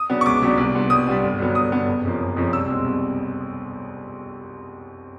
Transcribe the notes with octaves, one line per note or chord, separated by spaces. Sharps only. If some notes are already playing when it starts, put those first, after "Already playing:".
Already playing: D#6
C#3 F#3 B3 D4
C#6
C#2 D6
C#3 F#3 B3 D4
C2
A#2 G3 B3 D4
C2 D#6
A#2 G3 B3 D4
G1
G2 D3 F#3 B3
G1 D#6
G2 D3 F#3 B3
F#1
F2 C#3 F3 A#3
F#1
F2 C#3 F3 A#3
C2 E6
B2 G#3 C4
C2